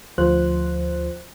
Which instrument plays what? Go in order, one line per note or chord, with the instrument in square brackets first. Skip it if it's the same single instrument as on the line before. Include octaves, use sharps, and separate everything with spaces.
[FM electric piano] D2 F3 F4 C5 F#6